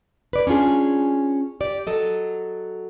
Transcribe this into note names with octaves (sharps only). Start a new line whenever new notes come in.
B4 D5
C#4 D4 F4 G#4
G4 D5
F#3 A4 D#5